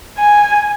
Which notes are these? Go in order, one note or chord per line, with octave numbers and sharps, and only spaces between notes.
G#5